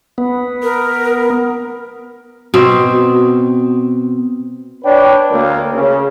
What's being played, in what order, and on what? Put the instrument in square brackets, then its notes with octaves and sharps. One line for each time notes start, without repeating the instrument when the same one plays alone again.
[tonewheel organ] B3
[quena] A#4
[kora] B2 C4
[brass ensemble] D4 B4 C#5 D5 G5
D2 A#3
C#3